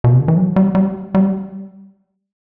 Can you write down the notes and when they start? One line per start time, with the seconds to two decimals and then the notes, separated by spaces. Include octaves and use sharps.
0.04 B2
0.13 C3
0.21 D3
0.28 E3
0.36 F#3
0.56 G3
0.75 G3
1.15 G3